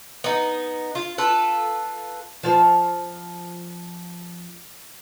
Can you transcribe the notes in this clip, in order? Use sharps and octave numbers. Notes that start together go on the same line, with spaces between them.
B3 D#4
F4
F4 A4 B4
F3 F4 C5